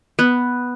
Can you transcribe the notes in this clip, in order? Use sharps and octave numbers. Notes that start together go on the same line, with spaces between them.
B3